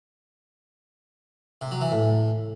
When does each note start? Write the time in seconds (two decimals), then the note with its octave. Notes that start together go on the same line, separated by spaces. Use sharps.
1.61 C3
1.71 F#3
1.81 E3
1.91 A2